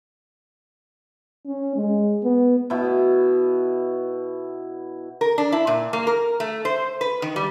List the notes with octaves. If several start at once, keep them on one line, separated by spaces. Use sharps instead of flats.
C#4
G#3
B3
B2 E4
A#4
D4
E4
A#2
A#3
A#4
A3
C5
B4
D#3
G3